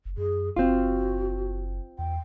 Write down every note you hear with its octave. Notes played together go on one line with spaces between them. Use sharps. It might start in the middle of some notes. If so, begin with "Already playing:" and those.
F#1
F#2 G#4
F#1 C4 F4 F#4
E2 G5